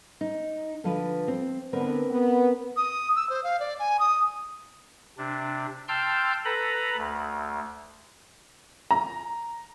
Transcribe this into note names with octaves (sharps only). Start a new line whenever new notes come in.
D#4
D3 F3 B4
C4
D3 B3 C4 A#4 B4
B3
D#6
E6
C5
F5
D5
G#5
D#6
C3 D4
G5 A5 C6 E6 F6 G6
A4 B4 A#5 B5
D2
A#5